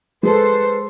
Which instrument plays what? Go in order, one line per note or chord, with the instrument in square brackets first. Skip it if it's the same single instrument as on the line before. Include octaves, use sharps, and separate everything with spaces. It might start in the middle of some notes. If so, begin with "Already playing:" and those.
[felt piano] G#3 [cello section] A4 C5 [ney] B4